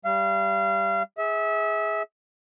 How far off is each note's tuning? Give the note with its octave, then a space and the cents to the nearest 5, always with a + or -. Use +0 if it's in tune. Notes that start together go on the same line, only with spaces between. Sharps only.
G3 +0 F5 -30
G#4 +0 E5 -25